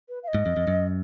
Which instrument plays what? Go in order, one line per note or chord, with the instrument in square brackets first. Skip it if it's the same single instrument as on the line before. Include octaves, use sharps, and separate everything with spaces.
[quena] B4
F5
D#5
[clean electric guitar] G#2
F2
F2
F#2